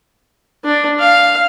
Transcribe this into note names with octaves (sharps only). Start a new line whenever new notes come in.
D4
F5